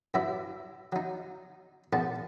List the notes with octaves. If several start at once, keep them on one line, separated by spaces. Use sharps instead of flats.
G2 F#3 E4 E5
F#3 D#4
A#1 G#2 B3 A5